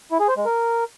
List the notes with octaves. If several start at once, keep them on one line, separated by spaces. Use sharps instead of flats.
E4
G#4
C5
G#3
A#4